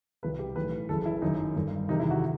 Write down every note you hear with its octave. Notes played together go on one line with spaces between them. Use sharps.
C2 B2 B4
G4
B1 A2 E3 B4
F#1 F#2 E3 A4
E4
G1 F#2 D#3 D#4
G1 G2 D#3
F#1 E2 C3 D#3 D#4
E4
F#4